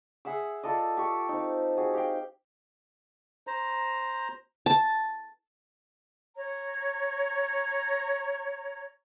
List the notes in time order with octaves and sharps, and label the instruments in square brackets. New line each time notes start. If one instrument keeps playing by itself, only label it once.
[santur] G#4 E5 F#5 E6
F4 A4 D5 D#5
G4 C#6 D6
C4 D#4
F#4 G#4
G4 F5 G5
[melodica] C5 A#5
[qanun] A5
[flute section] C#5 A#5